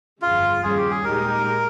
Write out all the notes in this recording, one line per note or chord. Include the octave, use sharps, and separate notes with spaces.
G1 F2 C#3 F4
D#2 C#3 G3 C#4 G#4
G4
G#4
A#2 G#3 D#4 G4 A#4